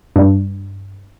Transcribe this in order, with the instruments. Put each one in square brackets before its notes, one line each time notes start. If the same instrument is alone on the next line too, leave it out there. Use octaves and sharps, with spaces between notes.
[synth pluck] G2